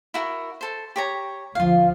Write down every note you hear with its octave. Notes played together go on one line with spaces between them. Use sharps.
E4 F#4 A#4
A4 C5
G4 C#5 A#5
D2 F3 F4 F5